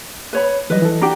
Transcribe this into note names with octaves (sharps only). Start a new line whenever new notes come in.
B4 C#5 B5
E3 F#3 G3 B4 D#5
E3 A4
D4 F#4 G4 A#5 D6